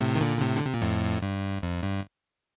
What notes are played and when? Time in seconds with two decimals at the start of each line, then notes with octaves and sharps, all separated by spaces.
0.01 A2 C3
0.15 D#3
0.21 A#2 D3
0.38 D3
0.41 A2 C3
0.56 D3
0.65 C3
0.74 A#2
0.82 F2 A2
1.22 G2
1.62 F2
1.83 G2